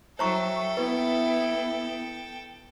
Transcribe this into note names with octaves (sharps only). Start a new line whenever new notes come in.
F#3 A4 C5 E5 G5 A#5 C#6
B3 E4 B4